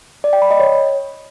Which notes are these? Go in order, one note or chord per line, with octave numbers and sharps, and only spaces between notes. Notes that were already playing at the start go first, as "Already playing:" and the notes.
D5
G5
B5
D#5
C#5